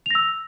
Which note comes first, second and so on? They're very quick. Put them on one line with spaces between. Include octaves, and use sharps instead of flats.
F7 A#6 E6